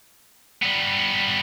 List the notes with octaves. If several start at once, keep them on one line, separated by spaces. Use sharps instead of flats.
G3 B3